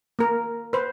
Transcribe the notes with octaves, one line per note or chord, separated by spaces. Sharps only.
A#3 A#4
B4 C5